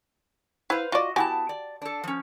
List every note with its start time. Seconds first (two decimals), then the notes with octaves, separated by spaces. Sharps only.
0.70 E4 B4 C5 F5
0.92 F4 F#4 D5 D#5
1.16 B3 E4 F#4 G4 G#5 A5
1.49 D5
1.82 D4 A4
2.04 F3 C#4